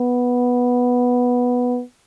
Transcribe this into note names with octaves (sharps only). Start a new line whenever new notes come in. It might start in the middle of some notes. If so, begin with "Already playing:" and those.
Already playing: B3